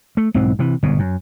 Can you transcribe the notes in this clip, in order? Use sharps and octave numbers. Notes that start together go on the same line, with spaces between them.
A3
B1 G#2 E3 C4
C3 E3
G1 G#2 B2
F#2